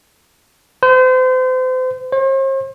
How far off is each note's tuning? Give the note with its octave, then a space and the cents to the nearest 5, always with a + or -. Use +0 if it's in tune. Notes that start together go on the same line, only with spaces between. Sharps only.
C5 -35
C5 +45